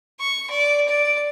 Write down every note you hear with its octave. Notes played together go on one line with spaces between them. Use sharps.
C#6
D5
D5